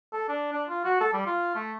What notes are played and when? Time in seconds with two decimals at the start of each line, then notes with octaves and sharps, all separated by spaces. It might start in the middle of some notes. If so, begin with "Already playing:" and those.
0.13 A4
0.28 D4
0.53 D4
0.69 F4
0.84 F#4
1.00 A4
1.13 G3
1.26 F4
1.55 A3